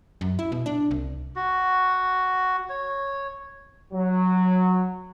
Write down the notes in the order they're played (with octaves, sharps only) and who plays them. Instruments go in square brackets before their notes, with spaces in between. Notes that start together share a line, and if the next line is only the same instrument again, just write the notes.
[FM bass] F#2
E4
B2
D4
C2
[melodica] F#4
C#5
[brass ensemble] F#3